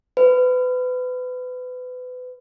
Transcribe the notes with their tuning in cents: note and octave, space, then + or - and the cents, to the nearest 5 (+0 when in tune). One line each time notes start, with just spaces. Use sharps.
B4 +30